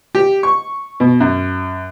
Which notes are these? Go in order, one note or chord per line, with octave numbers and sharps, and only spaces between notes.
G4
C#6
B2
F#2